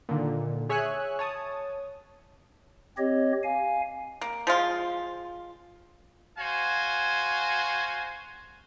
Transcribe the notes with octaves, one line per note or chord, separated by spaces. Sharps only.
A#2 D3 D#3
G#4 C#5 E5 G#5 E6 F#6
C#5 A5 D#6
C4 G4 C#5 D#5
F5 G#5
A#3
F3 G#3 F4 G#4
F#4 C5 F5 G#5